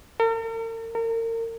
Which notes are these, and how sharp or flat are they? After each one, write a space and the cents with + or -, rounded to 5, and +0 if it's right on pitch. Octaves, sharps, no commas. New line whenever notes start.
A#4 -45
A#4 -35